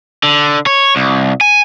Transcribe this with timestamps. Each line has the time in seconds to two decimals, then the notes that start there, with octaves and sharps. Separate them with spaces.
0.23 D3
0.66 C#5
0.96 C2
1.41 G#5